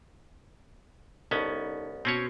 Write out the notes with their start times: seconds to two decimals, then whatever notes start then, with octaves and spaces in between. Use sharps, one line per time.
1.31 C2 B3 C#4 D#4 A4 C#5
2.05 B2 C4 C#4 C#5